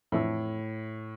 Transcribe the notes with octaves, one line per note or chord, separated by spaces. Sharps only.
F2 A2 E3 A3 D4 A4